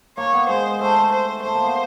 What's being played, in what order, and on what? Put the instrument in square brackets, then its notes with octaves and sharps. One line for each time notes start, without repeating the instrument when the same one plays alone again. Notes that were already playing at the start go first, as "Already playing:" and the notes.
[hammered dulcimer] A#3 [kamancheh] C#5
[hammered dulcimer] B3
[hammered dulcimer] G#3 [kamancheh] C5
[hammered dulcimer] A3 [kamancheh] C5
[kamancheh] C5
[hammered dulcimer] A3 [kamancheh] C5
[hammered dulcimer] A#3
B3